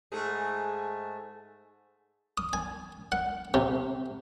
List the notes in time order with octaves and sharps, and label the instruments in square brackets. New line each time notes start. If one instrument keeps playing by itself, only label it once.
[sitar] G#2 A3 G#4
[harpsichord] D#6
G#5
F#5
C3